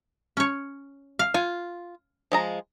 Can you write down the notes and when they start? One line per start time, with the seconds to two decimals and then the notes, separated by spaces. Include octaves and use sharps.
0.37 C#4 C#5
1.19 F5
1.34 F4 G#5
2.32 F3 G#3 A#5